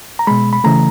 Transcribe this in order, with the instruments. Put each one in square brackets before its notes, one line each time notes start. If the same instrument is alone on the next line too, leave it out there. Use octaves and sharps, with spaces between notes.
[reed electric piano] A#5
B2 G#3 B5
B5
C#3 E3 A3 A#5